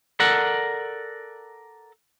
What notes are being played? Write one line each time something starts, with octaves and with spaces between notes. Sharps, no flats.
A4 A#4 D5 F#5